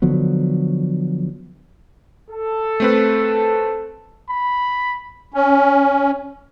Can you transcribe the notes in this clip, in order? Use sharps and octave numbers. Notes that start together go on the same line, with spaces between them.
D3 F3 F#3 B3
A4
A3 C4 B4
B5
C#4